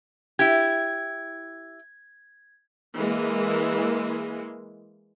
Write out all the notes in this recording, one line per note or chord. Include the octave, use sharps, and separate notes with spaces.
E4 G4 G#6
E3 G#3 A#3